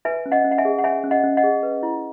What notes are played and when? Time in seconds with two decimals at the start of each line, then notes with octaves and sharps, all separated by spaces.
0.05 B4 E5 G#5
0.26 C#4
0.32 D#5 F#5
0.44 C#4
0.51 F#5
0.58 E5 G#5
0.65 G#4
0.78 F#5
0.84 C#5 E5 G#5
1.04 C#4
1.11 D#5 F#5
1.23 C#4
1.37 D#5 F#5
1.43 G#4
1.63 B4
1.83 E4